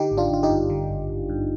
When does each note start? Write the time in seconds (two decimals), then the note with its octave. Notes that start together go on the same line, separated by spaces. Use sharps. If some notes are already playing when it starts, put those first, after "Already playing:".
Already playing: D3 D#4 G4
0.11 G#1
0.17 D4 F4
0.30 G#1 F4
0.43 D#4 G4
0.50 G2
0.70 D3
0.89 G#1
1.10 G#1
1.29 G2